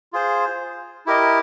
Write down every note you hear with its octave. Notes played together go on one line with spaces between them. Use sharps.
F4 G#4 C5
E4 G4 A#4 D#5